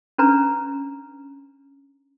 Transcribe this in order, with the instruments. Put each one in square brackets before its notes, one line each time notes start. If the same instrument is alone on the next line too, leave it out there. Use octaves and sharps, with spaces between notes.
[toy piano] C#4 D4 B4 A#5